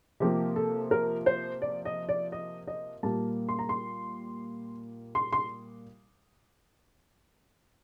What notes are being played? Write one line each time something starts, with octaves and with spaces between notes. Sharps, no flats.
C3 F3 A#3 G4
A4
A#4
C5
D5
D#5
D5
D#5
D#5
A#2 G3 A#3 A5
C6
A#5
C6
C6
C6